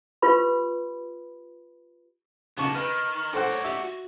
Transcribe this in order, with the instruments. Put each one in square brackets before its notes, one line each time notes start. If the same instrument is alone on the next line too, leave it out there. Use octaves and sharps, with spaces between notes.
[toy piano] F4 G4 B4 B5 C6
[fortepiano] C#3 C#6 [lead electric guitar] A#3 B3 [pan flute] A5
[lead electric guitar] D#3 [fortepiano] B4 [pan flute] F6
[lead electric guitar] F#4 D5 [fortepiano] A4 C5 F#5
[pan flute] C#5
[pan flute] G4 [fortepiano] E5
[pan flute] F#4